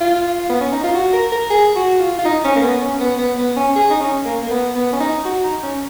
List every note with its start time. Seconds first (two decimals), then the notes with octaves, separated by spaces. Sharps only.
0.01 F4
0.50 B3
0.61 C#4
0.72 D#4
0.84 F4
0.94 F#4
1.13 A#4
1.32 A#4
1.50 G#4
1.76 F#4
2.00 F4
2.19 F4
2.25 D#4
2.45 C#4
2.56 A#3
2.62 B3
2.81 C#4
3.00 B3
3.19 B3
3.38 B3
3.57 C#4
3.76 G#4
3.90 D#4
4.00 C#4
4.25 A#3
4.43 A#3
4.51 B3
4.76 B3
4.93 C#4
5.00 D#4
5.25 F#4
5.44 D#4
5.63 C#4